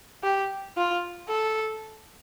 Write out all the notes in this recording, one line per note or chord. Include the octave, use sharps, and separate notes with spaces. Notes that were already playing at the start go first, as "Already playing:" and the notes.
G4
F4
A4